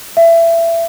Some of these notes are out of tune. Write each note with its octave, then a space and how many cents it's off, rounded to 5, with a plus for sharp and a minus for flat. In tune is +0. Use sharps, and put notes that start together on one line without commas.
E5 +20